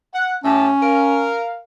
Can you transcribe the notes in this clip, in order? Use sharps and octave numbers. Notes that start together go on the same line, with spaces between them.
F#5
A2 C#4 G4 A5
A#4 F5